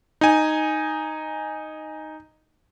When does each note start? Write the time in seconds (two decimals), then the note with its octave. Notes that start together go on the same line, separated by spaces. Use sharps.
0.21 D#4 G#5